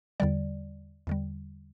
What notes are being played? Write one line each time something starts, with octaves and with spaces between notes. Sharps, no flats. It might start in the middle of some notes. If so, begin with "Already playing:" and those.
E2 D3 G3 D5
E2 D3 G3